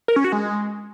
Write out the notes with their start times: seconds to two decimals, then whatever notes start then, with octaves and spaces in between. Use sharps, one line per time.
0.08 A#4
0.16 C#4
0.24 F#4
0.32 G#3